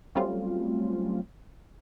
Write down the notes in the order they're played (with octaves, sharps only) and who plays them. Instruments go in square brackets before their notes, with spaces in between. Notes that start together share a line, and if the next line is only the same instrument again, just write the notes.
[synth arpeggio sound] F#3 G3 A3 C4 C#4 F4